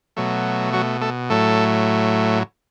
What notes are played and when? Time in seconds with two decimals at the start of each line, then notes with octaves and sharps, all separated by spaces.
0.17 B2 F#3 A3
0.73 F#3 F#4
1.01 A3 A4
1.30 A2 F#3 A3 A4